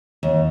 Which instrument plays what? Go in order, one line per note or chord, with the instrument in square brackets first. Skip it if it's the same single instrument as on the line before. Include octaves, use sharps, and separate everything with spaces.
[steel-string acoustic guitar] D#2